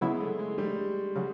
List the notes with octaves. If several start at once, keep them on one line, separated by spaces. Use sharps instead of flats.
C#3 F#3 G#3 B3 E4
A3
G#3
G3
C#3 F#3